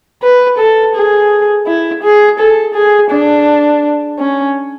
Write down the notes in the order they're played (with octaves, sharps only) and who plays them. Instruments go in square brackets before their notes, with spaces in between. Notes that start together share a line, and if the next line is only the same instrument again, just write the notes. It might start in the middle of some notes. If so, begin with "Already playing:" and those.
[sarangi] B4
A4
G#4
E4
G#4
A4
G#4
D4
C#4